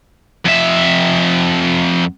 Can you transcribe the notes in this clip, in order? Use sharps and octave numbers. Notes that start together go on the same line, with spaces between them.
F2 E5